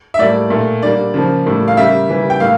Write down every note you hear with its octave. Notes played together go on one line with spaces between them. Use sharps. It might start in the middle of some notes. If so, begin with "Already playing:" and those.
E5
A2 G3 A#3 D5
A#2 A3
D3 G3 A#3 D5
C#3 F3 A#3
A2 G3 A#3
F5
C#3 G3 A#3 E5
C#3 E3 G3 A#3
G5
A2 G3 A#3 F5